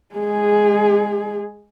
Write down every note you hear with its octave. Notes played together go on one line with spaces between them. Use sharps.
G#3 G#4